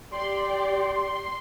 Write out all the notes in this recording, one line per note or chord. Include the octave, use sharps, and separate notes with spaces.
G4 D5 G5 C6